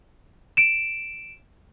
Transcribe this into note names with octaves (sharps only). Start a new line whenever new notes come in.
D7 E7